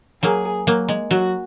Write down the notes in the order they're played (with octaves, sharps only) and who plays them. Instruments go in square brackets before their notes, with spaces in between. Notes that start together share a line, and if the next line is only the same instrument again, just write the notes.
[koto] F#3 A#3 [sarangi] G#4
[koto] F#3 A#3
G#3
[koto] F#3 [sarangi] F#4